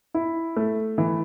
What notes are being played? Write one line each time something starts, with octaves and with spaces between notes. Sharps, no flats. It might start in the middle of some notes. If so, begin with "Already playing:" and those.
E4
A3
E3